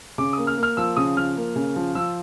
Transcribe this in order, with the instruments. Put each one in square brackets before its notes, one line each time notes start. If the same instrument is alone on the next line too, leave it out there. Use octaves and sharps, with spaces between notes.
[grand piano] C#3 D6
A#3 D#6
F6
A#3
F6
F3 E6
C#3 D#6
F3 F6
A#3
C#3
F3
F3 E6